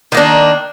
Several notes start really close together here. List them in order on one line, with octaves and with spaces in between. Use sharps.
D#3 A#3 D4